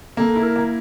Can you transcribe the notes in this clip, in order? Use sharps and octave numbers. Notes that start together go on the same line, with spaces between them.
A#3 A4
E4
A#4
A#3